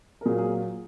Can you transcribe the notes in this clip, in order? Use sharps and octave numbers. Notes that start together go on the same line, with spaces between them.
A#4
A#2 F#3 A#3 G#4
G#4